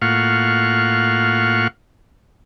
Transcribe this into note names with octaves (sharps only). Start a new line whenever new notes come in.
A2 A#3 F4 F5 F#5 C#6